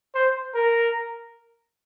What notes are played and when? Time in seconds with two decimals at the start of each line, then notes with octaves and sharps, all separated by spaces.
0.15 C5
0.55 A#4